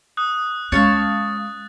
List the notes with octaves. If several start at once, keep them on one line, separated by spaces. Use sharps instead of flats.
D#6 F#6
G#3 C#4 C#5 F5 A5 A6